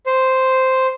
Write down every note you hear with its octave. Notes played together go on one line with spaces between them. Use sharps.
C5